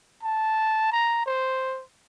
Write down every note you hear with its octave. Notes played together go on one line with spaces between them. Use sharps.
A5
A#5
C5